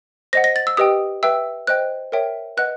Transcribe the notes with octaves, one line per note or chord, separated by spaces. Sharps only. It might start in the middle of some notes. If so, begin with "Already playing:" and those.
C5 D#5 F#5 A#6
A#6
A6
E6
G4 B4 D#5 G5 D#6
B4 E5 G5 E6
C5 D#5 G5 F#6
A#4 C#5 E5 G5
B4 D#5 F#5 F#6